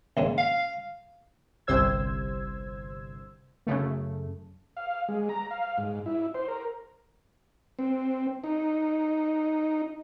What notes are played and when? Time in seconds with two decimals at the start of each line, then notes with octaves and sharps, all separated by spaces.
0.17 A#1 G#2 C#3
0.38 F5
1.67 G1 C2 C3 C5 E6 G#6
3.67 F#2 C#3 A3
4.77 F5
5.08 G#3
5.29 A#5
5.51 F5
5.78 G#2
6.06 E4
6.34 C5
6.48 A#4
7.79 C4
8.44 D#4